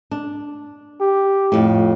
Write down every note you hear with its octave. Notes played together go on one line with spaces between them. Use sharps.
D4
G4
F2 A2